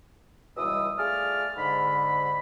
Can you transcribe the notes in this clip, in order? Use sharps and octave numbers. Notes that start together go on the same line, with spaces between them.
C#2 B2 E3 G3 D#6 E6
A3 F4 G#4 D5 F6
G#2 D3 B5